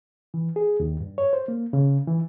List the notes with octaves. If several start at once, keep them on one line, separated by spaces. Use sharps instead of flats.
E3
G#4
D#2
G2
C#5
C5
A#3
C#3
E3